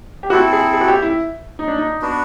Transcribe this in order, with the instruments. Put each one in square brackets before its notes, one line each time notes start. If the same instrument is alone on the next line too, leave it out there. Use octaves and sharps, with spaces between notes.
[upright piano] G4
[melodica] C4 E4 A4 [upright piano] F#4
[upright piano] G#4
G#4
F#4
G4
E4
D#4
D4
D#4
[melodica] B3 D4 F#4